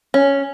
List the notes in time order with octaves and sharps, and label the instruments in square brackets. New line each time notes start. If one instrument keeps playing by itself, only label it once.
[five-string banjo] C#4